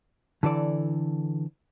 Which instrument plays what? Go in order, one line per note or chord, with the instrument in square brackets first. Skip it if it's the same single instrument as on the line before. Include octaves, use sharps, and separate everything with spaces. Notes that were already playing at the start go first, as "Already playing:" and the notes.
[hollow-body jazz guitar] D3 E3 A4 D5